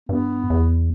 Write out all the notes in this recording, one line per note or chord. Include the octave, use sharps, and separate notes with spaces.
G2 B3
E2